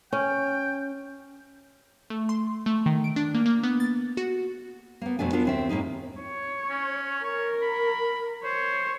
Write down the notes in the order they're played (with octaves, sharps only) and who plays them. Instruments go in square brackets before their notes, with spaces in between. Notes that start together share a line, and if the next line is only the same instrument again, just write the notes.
[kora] C#4 [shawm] G5
[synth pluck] A3
C6
A3
D#3
D7
D4
A#3
A#3
B3
A6
F#4
[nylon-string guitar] A#3 B3
F2 B2 A3 D4 G#5
B3 D4 F4 A#4
D#2 C4 E5
A2 A#3 D#4 G#4
[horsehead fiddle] C#5
[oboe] C#4
[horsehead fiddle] A#4 [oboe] C#5
[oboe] B5
[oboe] C5 [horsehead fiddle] C#5